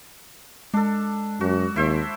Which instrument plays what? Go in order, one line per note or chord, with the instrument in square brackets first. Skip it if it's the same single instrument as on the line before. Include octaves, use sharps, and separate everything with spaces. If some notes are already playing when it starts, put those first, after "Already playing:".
[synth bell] G#3 [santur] D4 A4
[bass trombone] F#2 [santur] F#4
[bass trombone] D#2 [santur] E4 C5 E5